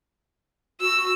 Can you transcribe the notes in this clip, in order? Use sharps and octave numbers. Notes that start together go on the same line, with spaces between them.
F#4 E6